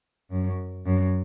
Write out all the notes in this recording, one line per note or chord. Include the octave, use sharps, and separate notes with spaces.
F#2
F#2